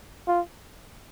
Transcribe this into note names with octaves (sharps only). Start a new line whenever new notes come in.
F4